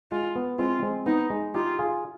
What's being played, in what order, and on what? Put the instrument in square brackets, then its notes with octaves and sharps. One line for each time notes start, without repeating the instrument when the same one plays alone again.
[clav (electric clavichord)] G#3 [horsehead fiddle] F4
[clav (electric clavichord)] B3
[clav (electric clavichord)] G#3 C4 [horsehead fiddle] F4
[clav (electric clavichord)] G#3 C4
[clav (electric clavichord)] B3 [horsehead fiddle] D#4
[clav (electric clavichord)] G#3
[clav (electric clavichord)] D#4 G4 [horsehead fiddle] F4
[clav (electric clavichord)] F4 G#4